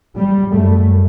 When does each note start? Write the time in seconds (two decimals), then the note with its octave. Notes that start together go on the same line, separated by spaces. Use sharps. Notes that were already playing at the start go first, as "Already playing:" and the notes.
0.17 G3
0.53 F#2 A3